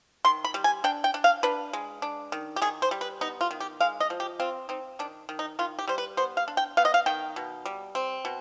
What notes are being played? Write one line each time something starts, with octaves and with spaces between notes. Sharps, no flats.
D#3 C6
B5
G3
G#5
D4 G5
G5
D4
F5
D4 B4
G#3
D4
D#3
G4
D#3 G#4
C5
G3
B4
B3 D#4
F4
D#3
G4
G#3 F5
D#5
F3
G4
C4 F4
C4 D#4
D#3 D4
D#3
D#4
D#3 F4
G4
G3 C5
B4
B3 C5
F5
D4
G5
B3 F5
D#5
F5
D#3 G5
B2
G3
C4
B2